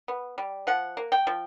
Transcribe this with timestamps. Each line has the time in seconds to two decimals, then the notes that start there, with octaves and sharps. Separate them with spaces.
0.08 B3
0.38 G3
0.67 F3 F#5
0.97 A#3
1.12 G5
1.27 F3